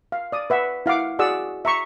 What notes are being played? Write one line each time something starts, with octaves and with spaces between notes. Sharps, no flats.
F5
D5 D#6
B4 E5 F#5
E4 F5 F#5 D6
F#4 G#4 D5 F#5 D#6 E6
E5 A#5 C#6